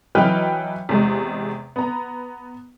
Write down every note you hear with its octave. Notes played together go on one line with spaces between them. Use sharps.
E3 F#3 B4 D#5 G5 F6
E2 C3 G#3
B3 A#5